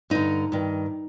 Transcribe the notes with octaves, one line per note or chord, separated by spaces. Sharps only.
G2 D3 D#4
G2 D#3